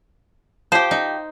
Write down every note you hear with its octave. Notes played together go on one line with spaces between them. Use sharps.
F3 G4 C5
D#4